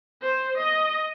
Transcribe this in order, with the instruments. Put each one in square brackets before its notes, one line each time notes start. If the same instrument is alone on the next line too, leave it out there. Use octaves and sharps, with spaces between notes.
[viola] C5
D#5